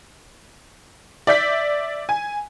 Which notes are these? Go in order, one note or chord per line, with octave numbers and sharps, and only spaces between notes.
D5 E5 G6 B6
G#5